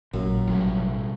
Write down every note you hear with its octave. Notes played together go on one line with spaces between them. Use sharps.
A1 F#2 A#2
A1 B2 F#3 G3 F4